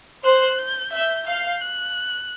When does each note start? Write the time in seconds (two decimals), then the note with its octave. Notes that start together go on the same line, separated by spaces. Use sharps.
0.24 C5 F#6
0.58 G6
0.92 E5 G6
1.26 F5 G6
1.61 F#6